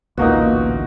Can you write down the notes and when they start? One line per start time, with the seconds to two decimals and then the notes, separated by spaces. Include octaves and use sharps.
0.17 A1 D2 A#2 A#3 B3 D#4 F#4